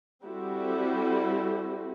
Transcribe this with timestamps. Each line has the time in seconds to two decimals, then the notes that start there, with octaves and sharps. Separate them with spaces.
0.24 G3 C4 E4 F#4 G4 A4